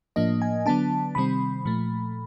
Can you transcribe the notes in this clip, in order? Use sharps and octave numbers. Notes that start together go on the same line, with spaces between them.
A2 F3 A#3 D4 D#5
G#5
D3 F#3 B3 D4 A5
C3 D#3 G3 C4 B5
A#2 F3 A3